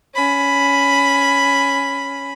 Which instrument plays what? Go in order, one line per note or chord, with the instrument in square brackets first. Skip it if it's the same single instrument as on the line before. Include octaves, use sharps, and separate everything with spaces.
[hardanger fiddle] C#4 B5